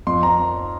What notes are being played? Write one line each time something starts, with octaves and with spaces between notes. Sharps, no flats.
F2 C6
A#5